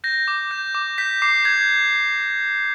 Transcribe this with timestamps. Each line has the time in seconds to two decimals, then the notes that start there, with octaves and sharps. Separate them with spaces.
0.04 G6 A#6
0.28 D6
0.51 G6
0.75 D6
0.98 G6 B6
1.22 D6 C7
1.45 G6 G#6